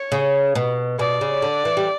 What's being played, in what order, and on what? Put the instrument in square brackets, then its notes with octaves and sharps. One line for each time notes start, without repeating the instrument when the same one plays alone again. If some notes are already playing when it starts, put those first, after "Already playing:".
Already playing: [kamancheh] C#5
[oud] C#3
B2
[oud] B2 [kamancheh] D5
[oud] C#3
D3
E3
G3